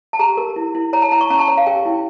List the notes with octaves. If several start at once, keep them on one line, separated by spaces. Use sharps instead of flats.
A5
G4 A#5
A#4
E4
E4
C#5 A#5
A5
E4 A#5
C#6
C#4 A#5
A5
C#5 A#5
F5
G4 G5
E4